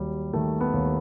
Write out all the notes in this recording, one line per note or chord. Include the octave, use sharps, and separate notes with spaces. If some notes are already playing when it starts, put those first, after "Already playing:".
Already playing: D#2 F#3 G3
D#3 A3
B3
D#2